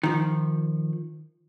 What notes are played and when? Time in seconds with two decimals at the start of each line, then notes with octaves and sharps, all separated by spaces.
0.03 D#3 F3